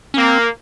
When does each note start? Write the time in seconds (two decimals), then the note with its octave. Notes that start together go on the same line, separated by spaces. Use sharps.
0.14 C#4
0.18 A#3 C4